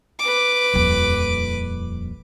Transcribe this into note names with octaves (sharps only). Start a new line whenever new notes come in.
B4 D6
D#1 F2